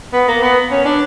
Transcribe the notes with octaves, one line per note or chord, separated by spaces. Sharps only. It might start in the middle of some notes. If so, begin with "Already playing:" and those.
B3
A#3
B3
C#4
D4